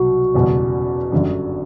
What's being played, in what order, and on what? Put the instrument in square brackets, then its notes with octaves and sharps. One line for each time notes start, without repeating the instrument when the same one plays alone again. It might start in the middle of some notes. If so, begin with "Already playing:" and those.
Already playing: [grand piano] C2 B2 F#3 [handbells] F#4
[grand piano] F#1 E2 B2 G3
G1 F#2 D3 G3